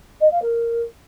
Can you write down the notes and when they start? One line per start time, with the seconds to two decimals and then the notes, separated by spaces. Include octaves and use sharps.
0.21 D#5
0.31 F5
0.42 A#4